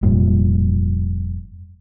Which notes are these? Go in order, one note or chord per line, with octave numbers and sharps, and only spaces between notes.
F1 G2 A#2